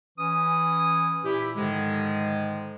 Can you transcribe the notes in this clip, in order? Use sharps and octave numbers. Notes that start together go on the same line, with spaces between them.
E3 C#4 D#6
A#2 E4 G4
G#2 D3 D#3 F3 G#3